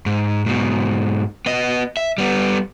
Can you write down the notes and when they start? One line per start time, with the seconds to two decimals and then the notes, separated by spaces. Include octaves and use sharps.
0.06 G#2
0.46 G#2 B2
1.46 B3 D#5
1.97 E5
2.18 G3 B3